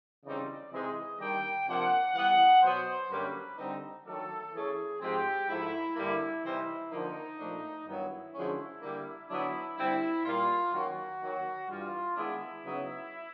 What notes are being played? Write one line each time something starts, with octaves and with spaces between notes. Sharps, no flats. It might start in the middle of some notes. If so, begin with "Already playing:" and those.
C#3 E3 G3 C4 D#4 D5
C3 E3 G#3 C4 D#4 D#5
D#3 G3 A#3 D4 G5
C3 F3 A#3 D4 F#5
E3 G3 B3 F#5
B2 F#3 B3 C5
F#2 D3 G3 A#3 C#4 B4
D3 G3 C4 D#4
D#3 F#3 A3 D4 A4
E3 A3 C#4 G#4
G#2 F3 G#3 C4 G4
G#2 F3 A3 E4
G2 D3 G3 A#3 E4
C3 E3 G3 C4 D#4 E4
D3 F3 A#3 D#4
A#2 F3 A3 D4
G2 D#3 F#3 B3 E4
F#2 D3 F3 G#3 C#4
D3 G3 A#3
D3 F#3 B3 D4 E4
D3 G3 C4 E4
A#2 G3 A#3 F4
D#3 F#3 A#3 C#4 F#4
D#3 F#3 A#3
G2 E3 G3 F4
D#3 G#3 B3 D4 E4
C#3 F#3 B3 D#4